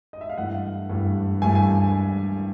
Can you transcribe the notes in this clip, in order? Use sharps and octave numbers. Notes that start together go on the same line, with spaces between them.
D#5
E5
F5
G2 E3 A3 F#5
G2 E3 A3
G2 E3 A3 G#5
G#5